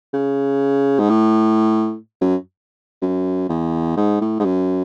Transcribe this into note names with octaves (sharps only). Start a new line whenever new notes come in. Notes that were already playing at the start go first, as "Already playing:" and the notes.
C#3
G#2
A2
F#2
F#2
E2
G#2
A2
G#2
F#2